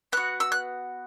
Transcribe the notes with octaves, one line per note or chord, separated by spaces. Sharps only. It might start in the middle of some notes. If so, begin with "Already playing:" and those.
B3 F#4 F#6
E6
F#6